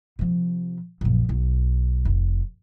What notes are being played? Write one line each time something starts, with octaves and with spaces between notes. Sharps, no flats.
C3 F3
A#1 F#2
B1
F1